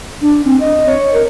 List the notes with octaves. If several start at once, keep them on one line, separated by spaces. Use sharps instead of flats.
D4
C4
D#5
C#5
A#4